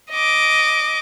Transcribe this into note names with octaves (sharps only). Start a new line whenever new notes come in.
D#5 D6